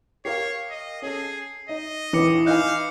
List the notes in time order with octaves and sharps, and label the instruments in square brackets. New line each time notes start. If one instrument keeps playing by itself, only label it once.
[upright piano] G4 A#4 F5 [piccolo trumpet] C#5 [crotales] C7
[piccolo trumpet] D#5
[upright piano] C#4 A4 [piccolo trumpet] G#4
[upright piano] D#4 [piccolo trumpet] D#5
[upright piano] D#1 D#2 [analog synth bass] E3 [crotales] D6 D#6 C#7
[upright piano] D#4 B4 G#5 [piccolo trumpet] F5 [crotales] F#6 G6